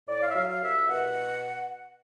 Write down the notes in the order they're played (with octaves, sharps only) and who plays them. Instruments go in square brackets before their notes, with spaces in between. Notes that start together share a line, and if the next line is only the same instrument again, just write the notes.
[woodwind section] A2 D5
F5
E5
F#3 F5
F5
C2 E5
B2 F#5